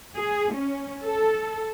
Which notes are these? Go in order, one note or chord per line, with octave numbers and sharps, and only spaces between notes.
G#4
C#4
A4